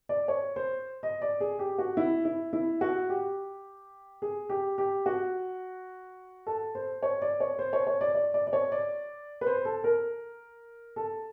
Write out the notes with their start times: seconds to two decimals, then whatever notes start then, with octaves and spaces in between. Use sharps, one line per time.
0.09 D5
0.28 C#5
0.56 C5
1.03 D#5
1.22 D5
1.40 G#4
1.59 G4
1.78 F#4
1.97 E4
2.25 E4
2.53 E4
2.81 F#4
3.09 G4
4.22 G#4
4.49 G4
4.78 G4
5.06 F#4
6.47 A4
6.75 C5
7.03 C#5
7.22 D5
7.40 C#5
7.59 C5
7.73 C#5
7.87 C#5
8.01 D5
8.15 D5
8.34 D5
8.47 D5
8.53 C#5
8.72 D5
9.41 B4
9.46 C5
9.65 A4
9.84 A#4
10.96 A4